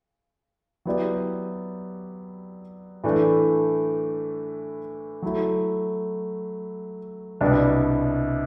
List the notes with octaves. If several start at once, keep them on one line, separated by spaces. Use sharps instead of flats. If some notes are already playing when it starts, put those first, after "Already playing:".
F#3 B3 E4 G4 D5
A2 E3 A3 D4
F#3 A3 E4
C2 B2 G3 B3 D4